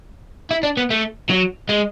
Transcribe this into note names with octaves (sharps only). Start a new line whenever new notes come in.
E4
D4
B3
A3
F#3
G#3